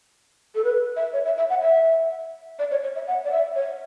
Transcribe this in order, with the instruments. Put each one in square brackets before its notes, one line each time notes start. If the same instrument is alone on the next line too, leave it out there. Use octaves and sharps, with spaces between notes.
[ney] A4
B4
E5
C#5
E5
E5
F#5
E5
D5
C#5
C#5
E5
F#5
D5
E5
C#5